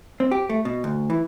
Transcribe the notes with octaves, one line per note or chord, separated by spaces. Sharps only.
C4
G4
A3
B2
D2
E3